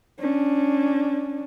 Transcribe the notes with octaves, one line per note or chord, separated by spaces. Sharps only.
C#4 D4